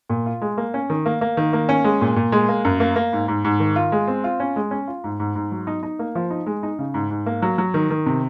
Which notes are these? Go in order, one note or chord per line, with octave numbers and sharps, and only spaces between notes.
A#2
F4
G#3
A#3
C#4
D#3
A#3
A#3
D#3
A#3
C#4
G#3
A#2
A#2
G#3
A#3
F#2
A#3
A#3
G#2
G#2
G#2
D#3
F4
G#3
C4
F4
C#4
G#3
C#4
F4
G#2
G#2
G#2
F#3
D#4
D#4
A#3
F3
D#4
G#3
D#4
C#3
G#2
G#2
A#3
F#3
F#3
D#3
D#3
C3